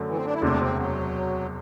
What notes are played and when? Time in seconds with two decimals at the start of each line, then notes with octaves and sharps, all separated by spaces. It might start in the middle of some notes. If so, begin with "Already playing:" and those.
Already playing: F#2 D3 A3
0.09 E3
0.16 C4
0.25 D4
0.33 E4
0.42 E1 D2 C3 D4
0.60 C4
0.76 F#3